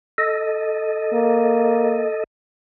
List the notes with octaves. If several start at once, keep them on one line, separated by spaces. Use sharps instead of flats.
A4 D#5
A#3